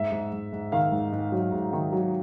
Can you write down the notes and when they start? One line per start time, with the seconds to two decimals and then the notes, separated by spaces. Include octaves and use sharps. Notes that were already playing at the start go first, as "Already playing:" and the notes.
Already playing: G#2 E5
0.12 G#2
0.33 G#2
0.53 G#2
0.72 D#3 F5
0.92 G#2
1.12 G#2
1.32 F#3
1.52 G#2
1.73 D#3
1.93 F#3